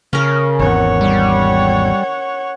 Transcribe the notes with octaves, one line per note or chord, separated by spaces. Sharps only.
C#3 C#4 A#4
G#1 E2 C#5 F#5
G3